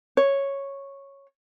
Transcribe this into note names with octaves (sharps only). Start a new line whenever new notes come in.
C#5